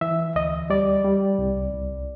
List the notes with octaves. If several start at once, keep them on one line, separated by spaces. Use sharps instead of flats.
E3 E5
D2 D#5
G3 D5
G3
C2
C2